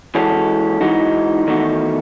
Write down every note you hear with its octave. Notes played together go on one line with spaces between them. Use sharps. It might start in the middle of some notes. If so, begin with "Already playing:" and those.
E3 G#3 C#4 F#4 A4
G#2 E3 G#3 D#4 F#4
E2 D#3 A3 D#4 F#4